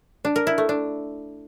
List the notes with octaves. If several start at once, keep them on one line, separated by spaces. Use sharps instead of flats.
D4
A#4
E4
A3
D4